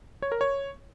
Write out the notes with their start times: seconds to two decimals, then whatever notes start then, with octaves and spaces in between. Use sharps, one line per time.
0.22 C#5
0.32 A#4
0.41 C#5